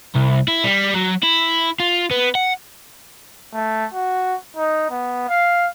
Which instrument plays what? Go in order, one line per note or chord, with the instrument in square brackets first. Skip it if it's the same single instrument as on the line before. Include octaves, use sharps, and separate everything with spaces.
[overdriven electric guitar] C2
E4
G3
F#3
E4
F4
B3
F#5
[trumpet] A3
F#4
D#4
B3
F5